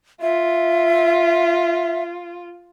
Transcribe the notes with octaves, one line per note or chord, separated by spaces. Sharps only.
F4 E5